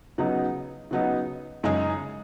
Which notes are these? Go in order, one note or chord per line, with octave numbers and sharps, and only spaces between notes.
C#3 F#3 B3 D#4
C#3 F#3 B3 D#4
F#2 C#3 G#3 D#4 G#4